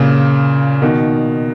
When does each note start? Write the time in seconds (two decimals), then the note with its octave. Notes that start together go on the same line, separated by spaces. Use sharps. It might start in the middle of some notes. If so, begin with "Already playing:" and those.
Already playing: A#2 C#3
0.82 B2 D#3